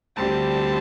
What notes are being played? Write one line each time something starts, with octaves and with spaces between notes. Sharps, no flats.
D2 D3 G3 C4 A5